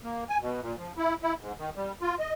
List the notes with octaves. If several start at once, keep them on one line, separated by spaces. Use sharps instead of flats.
A#3
G#5
B2
A#2
F3
E4
E4
G#2
D#3
G3
F4
D#5